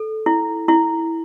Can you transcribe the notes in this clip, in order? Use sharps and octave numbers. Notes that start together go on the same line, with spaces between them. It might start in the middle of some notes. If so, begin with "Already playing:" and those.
Already playing: A4
E4
E4